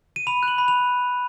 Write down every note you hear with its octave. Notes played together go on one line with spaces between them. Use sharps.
D#7
B5 F7
F#6
F#7
B5
F7